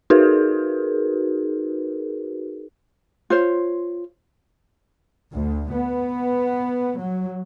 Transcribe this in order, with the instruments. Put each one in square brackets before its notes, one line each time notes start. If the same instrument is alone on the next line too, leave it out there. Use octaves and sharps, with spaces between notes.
[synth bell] D#4 F#4 G#4 A#4 B4
[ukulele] F4 C5 C#5
[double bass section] D2
B3
F#3